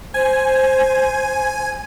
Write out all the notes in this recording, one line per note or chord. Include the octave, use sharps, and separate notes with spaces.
C5 G#5